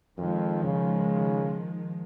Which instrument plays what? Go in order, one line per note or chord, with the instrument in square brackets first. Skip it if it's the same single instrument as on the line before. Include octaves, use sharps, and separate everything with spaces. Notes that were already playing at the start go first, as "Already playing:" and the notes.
[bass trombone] F2 [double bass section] D#3 F3 G#3
[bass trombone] C#3